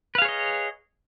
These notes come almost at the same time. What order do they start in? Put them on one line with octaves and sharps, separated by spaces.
B4 F5 G#4 C#5 D#5